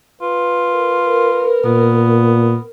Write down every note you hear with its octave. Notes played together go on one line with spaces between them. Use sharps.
F4 B4
A#4
A#2 B3